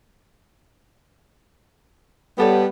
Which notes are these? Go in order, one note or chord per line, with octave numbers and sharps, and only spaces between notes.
G3 B3 G4 A4 C#5